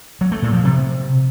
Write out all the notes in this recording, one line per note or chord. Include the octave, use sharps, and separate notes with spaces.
F#3
A3
A#2
F3
C3